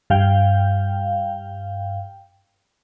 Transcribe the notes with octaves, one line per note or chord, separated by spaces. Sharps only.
G2 F5 G5